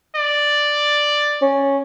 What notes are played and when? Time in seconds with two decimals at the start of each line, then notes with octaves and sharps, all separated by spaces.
0.16 D5
1.42 C#4